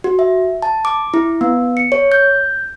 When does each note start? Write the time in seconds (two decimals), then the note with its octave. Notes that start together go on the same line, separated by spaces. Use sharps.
0.04 F#4
0.19 E5
0.62 A5
0.85 D6
1.14 E4
1.41 B3
1.77 C#7
1.92 C#5
2.12 G6